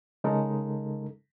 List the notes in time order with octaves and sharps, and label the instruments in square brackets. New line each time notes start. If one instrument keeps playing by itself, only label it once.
[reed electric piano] C#3 G#3 D#4 A4 A#4